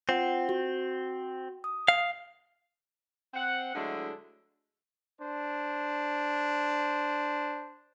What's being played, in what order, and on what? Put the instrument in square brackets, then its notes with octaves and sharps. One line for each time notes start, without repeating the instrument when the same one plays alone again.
[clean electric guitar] C4 [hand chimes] F4 F#5 G5
[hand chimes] F#4
D#6
[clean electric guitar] F5
[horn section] C4 F#5
D3 F#3 G#3 A3 D4 E4
[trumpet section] D4 C5